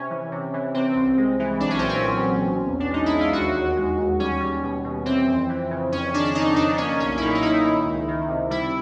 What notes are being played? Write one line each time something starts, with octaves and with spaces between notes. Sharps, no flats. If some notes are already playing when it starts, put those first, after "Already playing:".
Already playing: C3 C#4
E3
C3
E3
C3 C4
C2
G#3
E3
B1 D4
C#4
A#2 C4
C#4
F#3
B1
B2
E2
D4
G#3 D#4
E4
E2
F4
D#2 F#4
D#2
G#3
D#2
G3 C#4
G3
B2
B2
E3 C4
F2
E3
C#3
F2 C#4
D#3 D4
D4
D#3 D#4
F2 D4
A#3 C#4
B1 C#4
E4
A#2 D#4
D#4
A#2 E4
D#3
C#2
D#3
C3
G3 E4